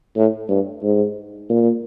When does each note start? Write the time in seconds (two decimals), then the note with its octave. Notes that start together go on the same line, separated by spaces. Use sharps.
0.17 A2
0.49 G2
0.83 G#2
1.49 A#2